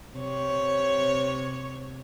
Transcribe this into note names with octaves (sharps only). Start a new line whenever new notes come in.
C3 C#5